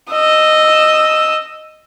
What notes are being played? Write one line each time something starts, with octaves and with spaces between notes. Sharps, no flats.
D#5 E6